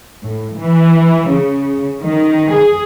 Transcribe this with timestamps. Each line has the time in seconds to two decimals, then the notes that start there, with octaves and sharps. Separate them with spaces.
0.23 A2
0.56 E3
1.28 C#3
2.01 D#3
2.52 G#4